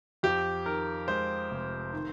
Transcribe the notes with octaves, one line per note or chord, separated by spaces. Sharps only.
F2 G4
D#3 A#4
G#3 C5
F1
D#3